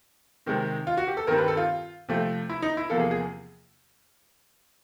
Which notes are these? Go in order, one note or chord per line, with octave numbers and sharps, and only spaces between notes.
C3 D#3 G#3 C4
F4
F#4
G4
A4
G2 D#3 G3 C4 A#4
B4
A4
F4
C3 F3 A3 C4
E4
D#4
E4
E2 C3 F3 A#3 A4
G#4
G#4